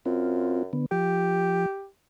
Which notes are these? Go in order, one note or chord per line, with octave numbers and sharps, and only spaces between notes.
F#2 C4 F4
D3 B3
F3 G4